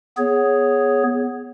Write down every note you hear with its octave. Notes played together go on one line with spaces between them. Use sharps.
B3 G#4 C#5